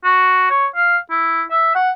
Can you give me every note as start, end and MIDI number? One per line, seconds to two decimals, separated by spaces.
0.05 0.47 66
0.51 0.66 73
0.76 0.97 77
1.10 1.42 64
1.51 1.74 76
1.75 1.91 78